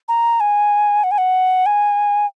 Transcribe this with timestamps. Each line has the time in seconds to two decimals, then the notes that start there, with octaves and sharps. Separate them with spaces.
0.08 A#5
0.40 G#5
1.04 F#5
1.11 G#5
1.18 F#5
1.66 G#5